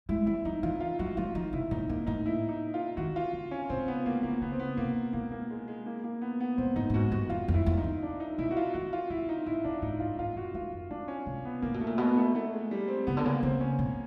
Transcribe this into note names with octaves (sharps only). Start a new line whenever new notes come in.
G#3 E4
G3 E4
F3 D#4
E3 F4
F4
F#3 F#4
F#3 F4
F3 D#4
C3 E4
A#2 D#4
A#2 A#3
A2 D#4
E4
D#4
F4
D#3 F#4
F4
D3
C#4
C3 C4
C#3 B3
C#3 A#3
D3 A#3
C#3 B3
C4
B3
C3 A#3
B2 A#3
A#3
G#3
G#3
A#3
A#3
B3
B3
A#2 C4
A2 D#4
A2
G#2 F#4
G2 F#4
F#2 F4
F2
E4
E2
D#4
F2
D4
D#4
B2 E4
F#4
F4
D#3 F#4
F4
D#3 E4
D#4
A#2 E4
A#2 D4
A2 D#4
G#2 F4
G#2 F4
F#2 F#4
F2 F4
F#2
F#2 D4
C#4
C3
B3
C3 A#3
B2
A3
A#2
B2 B3
A3
A3
G#3
G3
C4
C#3 B3
D3
C#3 A#3
C#3 C4
C#4
B2